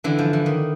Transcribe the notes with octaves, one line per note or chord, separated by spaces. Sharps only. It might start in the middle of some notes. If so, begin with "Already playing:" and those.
D3 E3
F3
E3
D#3